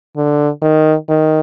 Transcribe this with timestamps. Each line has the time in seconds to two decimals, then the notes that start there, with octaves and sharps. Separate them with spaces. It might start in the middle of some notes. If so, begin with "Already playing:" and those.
0.16 D3
0.62 D#3
1.09 D#3